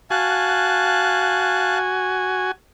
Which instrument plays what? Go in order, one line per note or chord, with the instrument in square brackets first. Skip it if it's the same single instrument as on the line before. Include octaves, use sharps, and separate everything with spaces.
[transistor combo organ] F#4 G#5 [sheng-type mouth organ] F5 A5 F#6